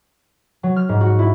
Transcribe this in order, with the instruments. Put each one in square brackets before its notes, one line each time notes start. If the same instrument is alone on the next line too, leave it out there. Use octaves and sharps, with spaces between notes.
[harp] F#3
F6
G#2
F#4
E4